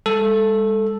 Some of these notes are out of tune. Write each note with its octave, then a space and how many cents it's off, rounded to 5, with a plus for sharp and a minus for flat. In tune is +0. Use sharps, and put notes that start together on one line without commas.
G#3 -40 A4 +0